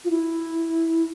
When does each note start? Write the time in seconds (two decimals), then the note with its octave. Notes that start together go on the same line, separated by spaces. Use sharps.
0.05 F4
0.10 E4